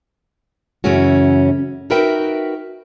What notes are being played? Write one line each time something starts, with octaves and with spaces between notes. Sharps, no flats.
F#2 C#3 E3 A3 C#4 F#4
D#4 F#4 A#4 B4 E5 G5